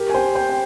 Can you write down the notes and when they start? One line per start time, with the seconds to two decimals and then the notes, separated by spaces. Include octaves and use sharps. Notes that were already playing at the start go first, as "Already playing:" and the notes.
Already playing: G4 A#4
0.10 G#5
0.14 C5 G5
0.35 C5 G5
0.49 G5